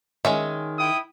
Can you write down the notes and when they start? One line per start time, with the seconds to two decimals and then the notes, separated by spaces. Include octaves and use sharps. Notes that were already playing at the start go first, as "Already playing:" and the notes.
0.25 D#3 G#3 C#4 E5
0.79 E4 G5 D#6